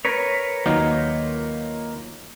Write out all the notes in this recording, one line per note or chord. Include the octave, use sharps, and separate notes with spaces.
A#4 B4 C#5
D#2 D#3 F#3 A#3 D#4 F4